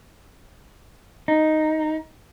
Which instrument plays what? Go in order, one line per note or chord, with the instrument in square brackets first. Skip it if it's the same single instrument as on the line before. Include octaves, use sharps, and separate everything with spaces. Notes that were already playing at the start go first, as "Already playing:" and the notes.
[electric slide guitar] D#4